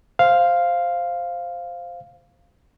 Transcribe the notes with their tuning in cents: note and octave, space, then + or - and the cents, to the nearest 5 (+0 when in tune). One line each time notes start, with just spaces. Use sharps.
C5 +0 F5 -5